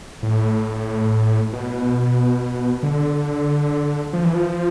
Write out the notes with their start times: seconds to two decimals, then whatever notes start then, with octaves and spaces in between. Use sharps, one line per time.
0.23 A2
1.53 B2
2.83 D3
4.13 F3
4.24 E3
4.35 F3